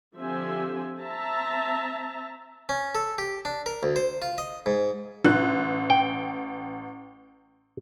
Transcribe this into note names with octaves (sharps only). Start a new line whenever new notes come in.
D3 F3 C4 G4 E5 G#5
C4 E5 A5 A#5
C#4
A4
G4
D4
A#4
D2
C5
F4
D#5
G#2
A1 F#6
G5